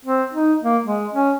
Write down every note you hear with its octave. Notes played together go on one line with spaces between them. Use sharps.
C4
D#4
A#3
G#3
C#4